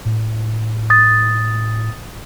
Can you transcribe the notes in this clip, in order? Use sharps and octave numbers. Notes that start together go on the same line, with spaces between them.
A2
D#6 A6